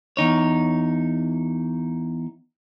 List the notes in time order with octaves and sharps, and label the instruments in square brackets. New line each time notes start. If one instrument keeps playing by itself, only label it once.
[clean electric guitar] E2 D#4 C#5